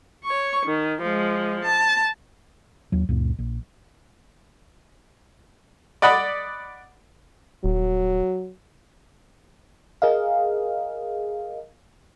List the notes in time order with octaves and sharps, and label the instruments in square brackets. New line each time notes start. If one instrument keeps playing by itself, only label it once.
[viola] C#5 C#6
D#3
F3 G#3
A5
[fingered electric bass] D#2 F#3
C#2 F#2 A#2
A#1
[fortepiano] D5 D#5 F#5 B5
[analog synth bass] D#1 [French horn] F#3
[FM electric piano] G#4 A#4 D#5 F5